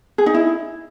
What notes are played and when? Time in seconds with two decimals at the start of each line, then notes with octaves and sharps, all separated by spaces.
0.18 G#4
0.26 D#4
0.34 E4